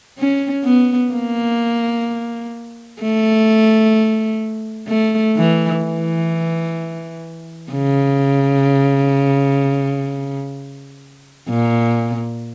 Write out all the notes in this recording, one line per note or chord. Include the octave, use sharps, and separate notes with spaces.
C#4
B3
A#3
A3
A3
E3
E3
C#3
A#2